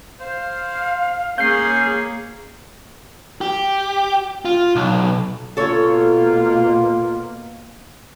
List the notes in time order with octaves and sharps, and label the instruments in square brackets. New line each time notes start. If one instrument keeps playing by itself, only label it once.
[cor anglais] C5 [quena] F5
[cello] A#3 G#4 [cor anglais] C#4 [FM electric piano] G6 C7
[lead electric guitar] G4
F4
B1
[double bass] B2 A#3 [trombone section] F4 [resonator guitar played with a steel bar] A4 C#5